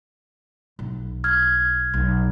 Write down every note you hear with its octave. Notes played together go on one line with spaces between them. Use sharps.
B1
F6 G#6
B1